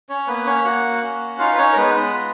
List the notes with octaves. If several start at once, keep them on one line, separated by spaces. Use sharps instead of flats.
C#4 C#5
A#3 B3 B4
C#4 C#5
A#3 F#4 F#5
C#4
D#4 F4 F5
B4
C#4 C#5
A#4
G#3 B3 B4
B3 B4
F4